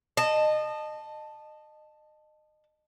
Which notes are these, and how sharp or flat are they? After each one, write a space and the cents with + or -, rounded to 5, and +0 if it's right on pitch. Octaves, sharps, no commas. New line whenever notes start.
D#5 -25 A5 +0